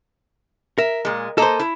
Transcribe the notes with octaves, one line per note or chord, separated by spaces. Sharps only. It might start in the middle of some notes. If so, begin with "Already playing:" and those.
A#4 E5
A#2 G#3
A#3 A4 C5 D#5
E4